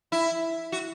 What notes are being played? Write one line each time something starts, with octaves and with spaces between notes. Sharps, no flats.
E4
F#4